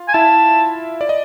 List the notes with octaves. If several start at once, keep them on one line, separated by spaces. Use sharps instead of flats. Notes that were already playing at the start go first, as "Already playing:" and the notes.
Already playing: F4 F5
G#5
E4 E5 A5
D5
D#5